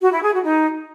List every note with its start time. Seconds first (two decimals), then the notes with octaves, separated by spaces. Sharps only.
0.01 F#4
0.12 E4
0.22 G#4
0.33 F#4
0.43 D#4